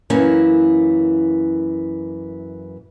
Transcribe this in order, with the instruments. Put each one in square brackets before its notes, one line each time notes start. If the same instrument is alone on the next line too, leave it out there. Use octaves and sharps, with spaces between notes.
[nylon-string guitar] F#2 E3 A#3 C#4